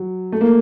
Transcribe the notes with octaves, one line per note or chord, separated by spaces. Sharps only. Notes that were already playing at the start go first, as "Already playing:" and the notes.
Already playing: F#3
A3
A#3